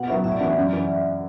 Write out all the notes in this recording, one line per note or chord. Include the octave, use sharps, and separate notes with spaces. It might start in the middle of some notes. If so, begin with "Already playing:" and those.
Already playing: B2 F#5
F#3 B3 F#4 E5
A2 E5
D5
E3 B3 D4 F#4 E5
F#2
E3